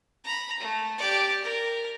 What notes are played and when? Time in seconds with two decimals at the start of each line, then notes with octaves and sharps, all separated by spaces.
0.24 A#5 B5
0.60 A3
0.98 G4 D5
1.44 A#4